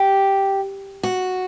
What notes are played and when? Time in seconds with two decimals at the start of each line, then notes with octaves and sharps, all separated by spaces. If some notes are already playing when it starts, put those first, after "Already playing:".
Already playing: G4
1.03 F#4